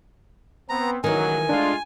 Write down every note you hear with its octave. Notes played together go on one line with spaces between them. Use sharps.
B3 C4 A#5
C#2 A2 D#3 E3 F#3 G#5
G#3 A3 D4 F4